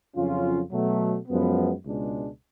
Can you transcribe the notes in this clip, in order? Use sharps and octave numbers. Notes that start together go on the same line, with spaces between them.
F2 C#3 F#3 C#4 F4
B2 F#3 A3
F#2 F3 G#3 B3
C#2 B2 G#3 D4